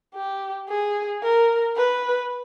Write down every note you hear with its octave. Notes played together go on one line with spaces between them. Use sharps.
G4
G#4
A#4
B4